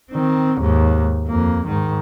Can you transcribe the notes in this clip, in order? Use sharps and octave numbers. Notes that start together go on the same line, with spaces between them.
D#3 C4
D#2 G#2
F2 A#3
G#2 D#3